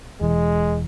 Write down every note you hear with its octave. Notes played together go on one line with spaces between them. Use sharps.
E1 E3 G#3